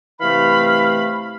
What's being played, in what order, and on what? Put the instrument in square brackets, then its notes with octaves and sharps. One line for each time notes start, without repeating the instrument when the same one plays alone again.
[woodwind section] C3 E3 A3 F5 B5